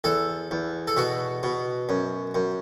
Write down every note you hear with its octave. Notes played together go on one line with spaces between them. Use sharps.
E2 A4
E2
A4
B2 F#4
B2
F#2
F#2